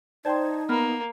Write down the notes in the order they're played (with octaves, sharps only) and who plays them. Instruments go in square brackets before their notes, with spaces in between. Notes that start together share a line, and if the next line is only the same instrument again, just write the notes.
[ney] D#4 [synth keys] C5 A5 G#6 [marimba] D5 G5 C6
[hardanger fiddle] A#3 [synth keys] B3 [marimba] B5 F6